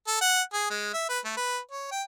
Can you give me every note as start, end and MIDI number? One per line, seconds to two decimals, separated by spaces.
0.07 0.19 69
0.21 0.41 78
0.53 0.69 68
0.70 0.91 56
0.93 1.08 76
1.09 1.19 71
1.25 1.33 57
1.36 1.59 71
1.71 1.91 73
1.91 2.02 79